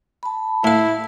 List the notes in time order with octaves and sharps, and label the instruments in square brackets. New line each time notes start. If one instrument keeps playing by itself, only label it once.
[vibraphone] A5 B5
[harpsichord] A2 F5 [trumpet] E4